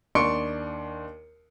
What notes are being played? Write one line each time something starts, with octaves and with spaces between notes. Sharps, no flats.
D#2 D4 C6 C#6 C#7 D7